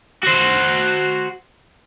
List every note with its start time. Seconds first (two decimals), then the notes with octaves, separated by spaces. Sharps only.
0.23 F#4 C5